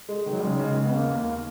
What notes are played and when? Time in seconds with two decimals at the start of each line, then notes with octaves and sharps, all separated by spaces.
0.09 G#3
0.26 D#3
0.32 F#3
0.42 C#3 G#3
0.60 C#3
0.76 C#3
0.86 B3
0.93 D#2 A#3
1.11 D#2